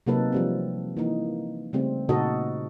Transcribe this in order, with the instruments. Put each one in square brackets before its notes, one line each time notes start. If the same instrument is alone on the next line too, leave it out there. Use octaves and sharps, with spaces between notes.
[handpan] C3 F#3 A#3 D#4 A4 B4
F3 G3 C4
E3 A#3 D#4
C#3 G3 A3 C4
A#2 C#3 D#4 F#4 A4 D#5